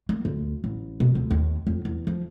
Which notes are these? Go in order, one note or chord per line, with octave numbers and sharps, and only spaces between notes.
A#3
D2
A1
B2
D2
D#2
F2
E2
F3